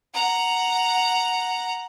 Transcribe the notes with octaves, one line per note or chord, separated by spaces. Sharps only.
F#5 A#5